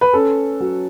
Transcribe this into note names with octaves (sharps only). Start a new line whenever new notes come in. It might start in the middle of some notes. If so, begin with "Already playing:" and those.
B4
C#4 A4
F#3